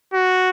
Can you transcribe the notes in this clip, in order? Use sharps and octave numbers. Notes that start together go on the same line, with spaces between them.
F#4